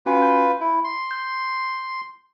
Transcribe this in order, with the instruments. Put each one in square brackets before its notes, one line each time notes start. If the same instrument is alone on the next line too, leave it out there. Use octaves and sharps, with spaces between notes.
[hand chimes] C#4 F#4 G#5 [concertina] F4 B4
[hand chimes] G6
[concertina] E4
C6
[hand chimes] G6